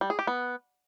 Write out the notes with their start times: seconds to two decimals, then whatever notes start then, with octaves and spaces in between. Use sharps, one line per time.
0.01 G3
0.10 G#4
0.19 G4
0.27 B3